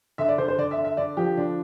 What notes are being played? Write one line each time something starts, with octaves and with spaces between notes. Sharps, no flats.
D3 E5
D5
D3 C5
C5
D3 D5
E5
D3
E5
D3 D5
F3 G4
D3 D4